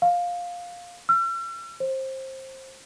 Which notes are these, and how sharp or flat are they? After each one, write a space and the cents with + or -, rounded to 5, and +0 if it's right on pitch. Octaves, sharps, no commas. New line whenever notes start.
F5 +10
E6 +45
C5 +20